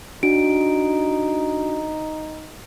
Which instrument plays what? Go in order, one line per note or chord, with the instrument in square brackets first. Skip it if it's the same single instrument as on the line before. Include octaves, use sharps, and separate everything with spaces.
[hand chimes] D4 F#4 D7 [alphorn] D#4